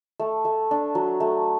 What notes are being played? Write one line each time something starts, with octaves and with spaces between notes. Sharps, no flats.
A3
A3
D4
F#3
A3